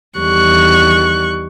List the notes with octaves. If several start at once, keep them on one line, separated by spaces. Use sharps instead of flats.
E2 D#3 G3 C#6 F#6